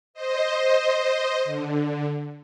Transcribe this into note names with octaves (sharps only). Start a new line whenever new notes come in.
C5 D#5
D3